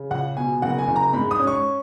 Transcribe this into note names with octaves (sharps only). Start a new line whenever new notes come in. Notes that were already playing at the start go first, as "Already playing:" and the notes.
Already playing: C#3
C#2 F#5
B2 G#5
F#1 F#5
G#5
F#1
A#5
G#2 B5
D#6
C#4
C#6